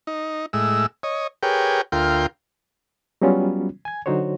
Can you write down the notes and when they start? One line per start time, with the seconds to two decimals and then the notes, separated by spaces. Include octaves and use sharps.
0.07 D#4
0.53 A2 G#3 E6
1.03 C#5 D#5
1.43 G4 G#4 A#4 B4 C#5 G5
1.92 D2 F4 A#4 G5 C6
3.22 F#3 G3 B3 C#4 F4
3.85 G#5 G#6
4.06 D3 F#3 D#4 F#4 C5 C#5